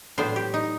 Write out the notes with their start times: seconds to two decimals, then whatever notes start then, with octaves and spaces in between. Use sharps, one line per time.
0.18 A2 F#3 B3 D4 C5
0.36 G4
0.54 D#4